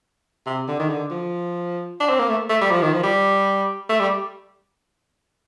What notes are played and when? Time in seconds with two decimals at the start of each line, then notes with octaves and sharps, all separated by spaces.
0.46 C3
0.68 D3
0.79 D#3
0.89 D3
1.11 F3
2.00 D4
2.10 C4
2.19 A#3
2.29 A3
2.49 A3
2.61 G3
2.72 F3
2.82 D#3
2.93 F3
3.03 G3
3.89 A3
4.00 G3